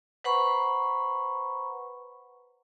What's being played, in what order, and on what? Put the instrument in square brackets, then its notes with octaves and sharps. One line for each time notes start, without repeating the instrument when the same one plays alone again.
[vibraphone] B4 C5 F#5 A#5 B5 C#6